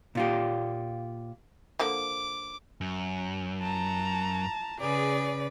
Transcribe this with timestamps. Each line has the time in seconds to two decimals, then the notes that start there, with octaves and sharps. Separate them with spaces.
0.15 A#2 F4 G4
1.79 D3 F3 A#3 D6
2.81 F#2
3.61 A5 A#5
4.80 C#3 G#4 B4 D5